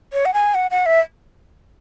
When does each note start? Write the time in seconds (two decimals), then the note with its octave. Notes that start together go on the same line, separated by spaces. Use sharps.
0.13 C#5
0.25 F#5
0.34 G#5
0.55 F#5
0.71 F#5
0.86 E5